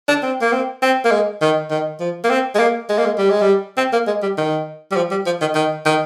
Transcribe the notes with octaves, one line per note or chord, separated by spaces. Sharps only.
D4
C4
A#3
C4
C4
A#3
G#3
D#3
D#3
F3
A#3
C4
G#3
A#3
G#3
A#3
G#3
G3
G#3
G3
C4
A#3
G#3
G3
D#3
G3
F3
G3
F3
D#3
D#3
D#3